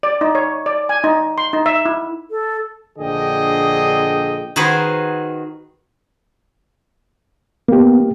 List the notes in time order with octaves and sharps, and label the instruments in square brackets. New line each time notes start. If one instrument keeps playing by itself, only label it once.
[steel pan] D5
D#4
C#5
D5
G#5
D#4
C6
D#4
E5
E4
[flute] A4
[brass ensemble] A#1 D3 G#4 D#5 G5
[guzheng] D#3 F#4 G#4 B4 C5 B5
[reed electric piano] A#3 G4 [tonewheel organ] B3